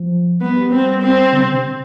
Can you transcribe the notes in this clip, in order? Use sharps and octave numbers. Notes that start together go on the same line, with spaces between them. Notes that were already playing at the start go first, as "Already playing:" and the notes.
Already playing: F3
G3 B3
G3
G3 C4
C4
D3
C3
C3